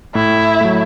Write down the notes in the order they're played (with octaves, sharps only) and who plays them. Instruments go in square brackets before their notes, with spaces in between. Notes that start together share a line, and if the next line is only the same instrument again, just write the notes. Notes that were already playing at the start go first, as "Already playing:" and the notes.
[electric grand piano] A2 [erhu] E4
[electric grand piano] F#3 A3